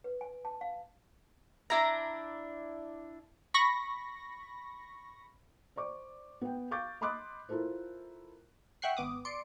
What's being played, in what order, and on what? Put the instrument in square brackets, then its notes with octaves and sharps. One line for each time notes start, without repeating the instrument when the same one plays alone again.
[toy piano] B4
G#5
A5
F5
[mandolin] D4 E4 A#5
[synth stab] B5 C#6 A#6
[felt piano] C5 D5 C#6 D6
B3 G5
F5 C#6 D6 G6 A6
D#5 B5 C6 D6 D#6 F#6
E4 F4 A4 A#4 C5
[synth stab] E5 F#5 G5 C#6 F#6 C7
G#1 B3 D6 D#6
D5 C6 C#7 D7